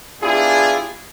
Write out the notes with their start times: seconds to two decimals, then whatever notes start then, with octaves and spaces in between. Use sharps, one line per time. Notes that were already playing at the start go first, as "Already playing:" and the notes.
0.22 B3 D4 E4 F4 G4 G#4